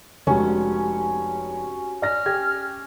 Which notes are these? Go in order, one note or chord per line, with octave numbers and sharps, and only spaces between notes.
F1 G#3 C#4 F#4 G4 C#5
D5 F6 A#6
G4 G#6